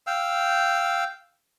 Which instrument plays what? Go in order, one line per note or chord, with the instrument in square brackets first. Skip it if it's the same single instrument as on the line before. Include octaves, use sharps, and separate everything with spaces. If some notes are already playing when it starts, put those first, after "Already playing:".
[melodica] F5 G5 E6